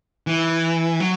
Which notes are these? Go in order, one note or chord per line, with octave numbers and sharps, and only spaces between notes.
E3
F#3